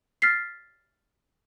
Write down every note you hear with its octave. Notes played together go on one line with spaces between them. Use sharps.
F6 A6 B6 C7